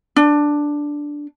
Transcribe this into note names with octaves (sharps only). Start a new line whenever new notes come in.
D4